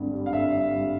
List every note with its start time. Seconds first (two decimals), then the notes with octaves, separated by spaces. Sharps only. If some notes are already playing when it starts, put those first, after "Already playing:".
Already playing: G#1 G2 D3
0.13 G3
0.26 F5
0.33 D3 E5
0.52 G2
0.73 G3